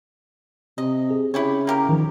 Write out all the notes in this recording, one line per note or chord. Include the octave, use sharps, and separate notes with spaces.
C3 D#5
G#4
C#3 E4 G4 C#5
A#3 G4 A#4
D#3 F3